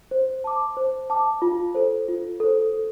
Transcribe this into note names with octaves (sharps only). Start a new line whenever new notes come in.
C5
A5 D6
C5
A5 D6
F4
A4 C5
F4
A4 C5
A4